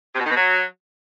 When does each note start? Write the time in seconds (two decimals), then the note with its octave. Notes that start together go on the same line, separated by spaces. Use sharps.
0.14 C3
0.19 B2
0.25 D#3
0.30 B2
0.36 F#3